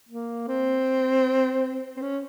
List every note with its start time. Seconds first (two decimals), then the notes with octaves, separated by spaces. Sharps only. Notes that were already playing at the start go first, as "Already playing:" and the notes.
0.09 A#3
0.48 C4
1.97 C4
2.02 C#4